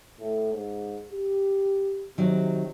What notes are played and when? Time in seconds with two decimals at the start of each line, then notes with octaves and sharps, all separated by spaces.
0.20 A2
0.54 G#2
1.12 G4
2.18 C3 D#3 F#3